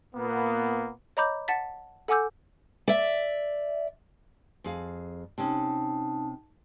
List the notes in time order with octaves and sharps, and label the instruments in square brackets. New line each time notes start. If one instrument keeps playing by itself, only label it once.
[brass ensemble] A#2 A#3 B3
[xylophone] C#5 D#5 A#5 B5 D6 G6
F#5 A5 A6 B6
A4 F#5 G#5 D6 E6 G6
[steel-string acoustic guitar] D5 E5
[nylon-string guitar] F2 G#4 F5
[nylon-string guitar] C3 C#4 [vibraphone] D#4 A5